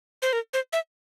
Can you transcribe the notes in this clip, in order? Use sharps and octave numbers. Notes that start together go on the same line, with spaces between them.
C5
A#4
C5
E5